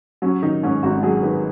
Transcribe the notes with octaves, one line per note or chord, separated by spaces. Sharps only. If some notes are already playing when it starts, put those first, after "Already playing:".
F#3 C#4
D#3 D#4
G#2 C#4
G#1 F#4
F#3 G#4
D#3 B4